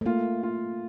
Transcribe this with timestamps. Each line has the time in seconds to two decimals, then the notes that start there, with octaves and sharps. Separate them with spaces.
0.01 A3
0.06 A#3 F4
0.43 F4